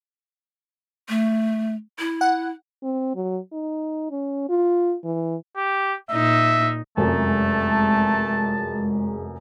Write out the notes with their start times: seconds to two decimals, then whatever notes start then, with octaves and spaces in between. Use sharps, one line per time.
1.09 A3
1.99 E4
2.21 F#5
2.83 C4
3.15 F#3
3.53 D#4
4.11 C#4
4.50 F4
5.04 E3
5.57 G4
6.11 A#2 D#4 E5
6.97 F1 F#2 G#3 A3 A5